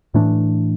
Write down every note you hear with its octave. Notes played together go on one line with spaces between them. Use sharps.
A2 E3 A3 D4